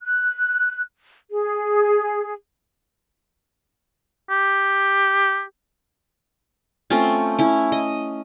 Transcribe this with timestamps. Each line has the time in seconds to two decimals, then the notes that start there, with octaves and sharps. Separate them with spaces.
0.02 F#6
1.31 G#4
4.30 G4
6.90 A3 C4 C#4 F4
7.38 C#4 E4
7.72 D#5